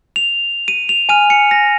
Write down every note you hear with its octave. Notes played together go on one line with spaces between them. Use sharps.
F7
D#7
F7
G#5 F6 D#7
C#7
A#6